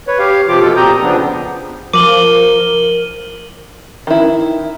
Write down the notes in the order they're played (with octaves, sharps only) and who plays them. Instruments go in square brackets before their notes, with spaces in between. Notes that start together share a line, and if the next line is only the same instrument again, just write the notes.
[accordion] B4 C#5
G4 F5
C3 F3 F4 G4 D6
B2 F4 A4
A#2 C4 G4 A#5 D#6 G6
C#3 F3 B3 D4
[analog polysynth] F3 [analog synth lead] A#4 [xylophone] D6 [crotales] D#7 F#7 G7
[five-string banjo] D#3 E4